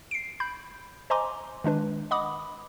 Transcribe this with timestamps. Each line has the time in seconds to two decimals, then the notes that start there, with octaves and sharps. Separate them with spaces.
0.11 C7 D7
0.40 B5 G6
1.10 C5 D#5 G#5 A#5 C6 D6
1.64 D#3 G#3 D4 B4
2.11 D#5 F#5 B5 D6 D#6